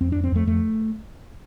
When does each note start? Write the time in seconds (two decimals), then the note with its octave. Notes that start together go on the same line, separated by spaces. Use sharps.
0.01 F2 C4
0.12 F2 D4
0.24 C4
0.32 F2 A3
0.47 F2 A3